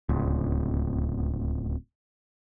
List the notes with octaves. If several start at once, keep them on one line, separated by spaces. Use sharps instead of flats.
D1 C#2